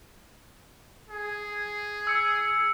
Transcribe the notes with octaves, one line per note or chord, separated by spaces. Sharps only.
G#4
E6 C#7